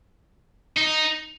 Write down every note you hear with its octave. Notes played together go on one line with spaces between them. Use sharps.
D#4